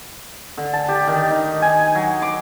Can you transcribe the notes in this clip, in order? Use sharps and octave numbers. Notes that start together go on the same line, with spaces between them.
D3
A5
G4
D#3
D#4
G#5
F#3
D6